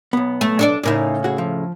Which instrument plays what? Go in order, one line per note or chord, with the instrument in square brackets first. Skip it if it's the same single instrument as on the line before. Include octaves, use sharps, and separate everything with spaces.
[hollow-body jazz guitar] B1 B3
[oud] A3
D4 A4 D5
[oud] A2 C#3 E4 [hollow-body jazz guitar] D#4 A#4 D5
[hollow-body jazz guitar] F#4 G#4
F3